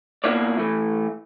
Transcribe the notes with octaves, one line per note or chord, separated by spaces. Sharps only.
B2 A#3 E4 C#5 D5
E3 A3